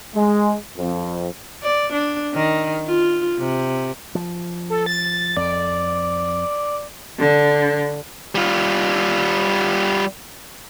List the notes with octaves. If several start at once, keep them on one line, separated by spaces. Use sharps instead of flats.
G#3
F2
D5
D4
D#3
F4
C3
F3
A4
A6
F2 D5
D3
G3 F4